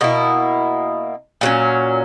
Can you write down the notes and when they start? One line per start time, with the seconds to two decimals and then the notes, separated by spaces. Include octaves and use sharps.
0.01 B2 A#3 E4
1.41 A#2 F#3 C#4